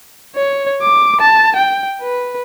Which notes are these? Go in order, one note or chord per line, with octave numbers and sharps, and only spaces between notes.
C#5
D6
A5
G5
B4